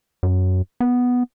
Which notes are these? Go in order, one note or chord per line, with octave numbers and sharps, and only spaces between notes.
F#2
B3